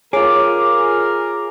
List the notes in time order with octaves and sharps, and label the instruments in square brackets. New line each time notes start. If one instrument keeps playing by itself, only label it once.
[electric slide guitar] F4 G#4 [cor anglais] A#4 [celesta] C#5 [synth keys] D6